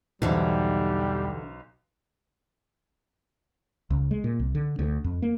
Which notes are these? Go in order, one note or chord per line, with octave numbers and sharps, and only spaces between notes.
B1 E2 B2 D3 E3 G3 D#4 C5
C#2
G#3
A#2
C2
D3
D2
F2
A#3